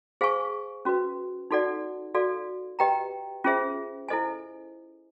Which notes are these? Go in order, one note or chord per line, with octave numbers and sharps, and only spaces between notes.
G#4 C5 F5 G#5 C#6
C#4 F#4 B4
D#4 F#4 A4 D5 F#5
F#4 A4 D5 F5
G4 B4 D#5 G5 A#5
C#4 F4 G#4 C5 E5
E4 A4 C5 D#5 G#5